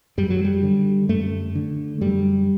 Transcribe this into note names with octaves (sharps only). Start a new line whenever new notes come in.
F#2 G3
F#3
G3
D3
F#2 A3
D3
F#2 G3